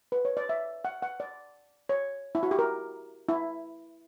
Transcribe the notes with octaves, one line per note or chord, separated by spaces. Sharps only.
B4
C#5
D5
E5
F#5
F#5
D5
C#5
E4
F#4
G4
A#4
E4